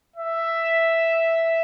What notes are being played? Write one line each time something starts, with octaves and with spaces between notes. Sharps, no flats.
E5